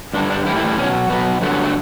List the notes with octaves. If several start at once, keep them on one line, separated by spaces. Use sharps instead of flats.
G2 D3 G3 D4
D4
A2 E3 G3 E4
E4
B2 F#3 C#4
B2 F#3 B3
G2 D3 F#3 A3
B3
A3